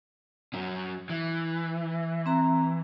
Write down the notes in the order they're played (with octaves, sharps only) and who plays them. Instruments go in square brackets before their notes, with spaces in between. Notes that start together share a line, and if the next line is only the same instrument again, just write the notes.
[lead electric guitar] F#2 C#4
E3
[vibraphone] C4 A#5